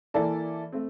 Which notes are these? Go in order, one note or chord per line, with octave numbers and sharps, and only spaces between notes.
E3 A#3 E4 A4 D5
A3 C4